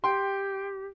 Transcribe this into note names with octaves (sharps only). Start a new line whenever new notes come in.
G4 G5 C6